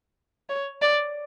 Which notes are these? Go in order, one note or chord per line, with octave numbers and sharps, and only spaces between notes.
C#5
D5